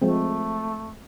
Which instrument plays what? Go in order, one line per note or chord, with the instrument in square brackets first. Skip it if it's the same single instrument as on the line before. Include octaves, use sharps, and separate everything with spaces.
[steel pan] F3 G#3 C4 [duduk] A3